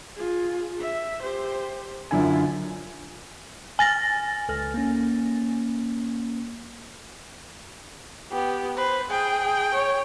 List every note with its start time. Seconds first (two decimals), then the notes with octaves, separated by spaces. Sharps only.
0.16 F4 G#4
0.80 E5
1.21 G4 C5
2.11 F#2 D3 E4 F4 G#5
3.79 G#5 A6 A#6
4.49 C#2 A4 F6
4.74 A#3 C#4
8.32 B3 G4
8.77 B4 C5
9.10 G#4 G5
9.74 C#5